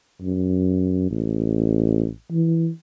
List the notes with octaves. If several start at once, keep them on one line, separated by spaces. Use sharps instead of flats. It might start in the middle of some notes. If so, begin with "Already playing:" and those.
F#2
A1
E3